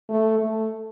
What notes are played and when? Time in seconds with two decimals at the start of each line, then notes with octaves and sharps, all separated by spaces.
0.09 A3
0.39 A3